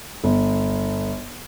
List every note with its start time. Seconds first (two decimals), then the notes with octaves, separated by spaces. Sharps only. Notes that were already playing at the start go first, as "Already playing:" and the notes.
0.24 G1